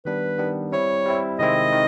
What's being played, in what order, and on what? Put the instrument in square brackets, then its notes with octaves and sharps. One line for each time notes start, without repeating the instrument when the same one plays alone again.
[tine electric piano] D#3 G3 B3 D4 [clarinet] B4
[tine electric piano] D#3 G3 B3 D4
[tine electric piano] G3 C4 E4 [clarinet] C#5
[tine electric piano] G3 C4 E4
[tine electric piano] C3 D#3 G#3 C4 E4 [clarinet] D#5
[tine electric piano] D#3